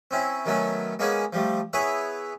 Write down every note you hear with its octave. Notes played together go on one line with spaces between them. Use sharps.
C4 C#4 E4
D#3 F#3 A3 B3 C#4
G#3 A#3 B3 C#4 G#4 F#5
F3 G3 A3
B3 E4 G#4 B4 C#5